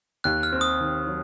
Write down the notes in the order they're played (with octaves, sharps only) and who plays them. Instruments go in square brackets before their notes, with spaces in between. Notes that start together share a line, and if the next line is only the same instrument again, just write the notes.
[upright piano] D#2 [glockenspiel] F#6
[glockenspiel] F6
[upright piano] C4
[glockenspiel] D#6
[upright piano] D#3
F#3